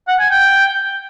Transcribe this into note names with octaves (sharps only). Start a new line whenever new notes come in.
F#5
G#5
G5